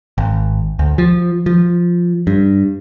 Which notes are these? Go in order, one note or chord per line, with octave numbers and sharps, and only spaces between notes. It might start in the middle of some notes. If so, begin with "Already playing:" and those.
G#1
D2
F3
F3
G2